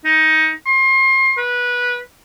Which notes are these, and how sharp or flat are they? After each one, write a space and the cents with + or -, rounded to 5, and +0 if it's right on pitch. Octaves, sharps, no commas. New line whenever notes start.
D#4 +20
C6 +30
B4 -15